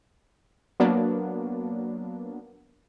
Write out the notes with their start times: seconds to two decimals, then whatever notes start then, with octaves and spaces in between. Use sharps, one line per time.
0.80 F#3 A#3 B3 D4